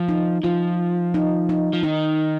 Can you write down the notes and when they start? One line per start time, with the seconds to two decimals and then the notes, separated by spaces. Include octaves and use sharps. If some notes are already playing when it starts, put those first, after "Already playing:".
Already playing: F3
0.09 D#4
0.43 F3 F4
1.14 D#4
1.49 D#4
1.73 F3
1.83 D#3 D#4